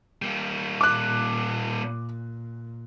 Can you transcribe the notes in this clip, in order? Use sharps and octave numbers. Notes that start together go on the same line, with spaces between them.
G3 A#3
A#2 D6 F#6